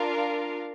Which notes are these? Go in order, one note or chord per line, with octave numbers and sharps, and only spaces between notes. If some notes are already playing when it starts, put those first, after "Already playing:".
Already playing: D4 F4 A#4 F5